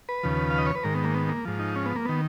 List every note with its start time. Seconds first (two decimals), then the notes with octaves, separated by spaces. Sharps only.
0.09 B4
0.23 D#2 C#3 F3
0.51 F5
0.58 D#5
0.66 C#5
0.75 B4
0.83 G#2 D#3 A#4
0.95 B3
1.04 A#3
1.14 B3
1.29 A#3
1.45 G#2 F3
1.59 D#4
1.76 C#4
1.86 B3
1.95 A#3
2.05 D#3 B3